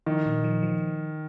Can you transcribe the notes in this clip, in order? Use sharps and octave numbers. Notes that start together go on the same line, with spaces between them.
D#3 F3
A#2
F3
F3